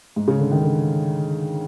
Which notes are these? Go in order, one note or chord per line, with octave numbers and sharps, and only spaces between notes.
G#2
C#3
D3
D#3
D3